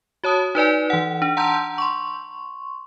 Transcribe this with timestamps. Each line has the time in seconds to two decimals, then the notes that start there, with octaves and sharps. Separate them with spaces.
0.24 F#4 C#5 A5 D#6
0.55 D#4 B4 D5 G#5
0.90 E3 F#5
1.22 D4
1.37 F#5 A5 A#5 C6 E6 G6
1.78 C6 C#6